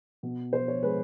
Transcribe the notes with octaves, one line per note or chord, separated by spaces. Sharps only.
B2
B2 C5
C#5
G#3 B4